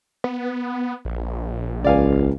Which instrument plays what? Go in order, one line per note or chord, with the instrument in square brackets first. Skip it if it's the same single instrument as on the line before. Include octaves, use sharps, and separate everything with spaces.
[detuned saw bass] B3
A#1
[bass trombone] C#2 [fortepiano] D5 F5 G#5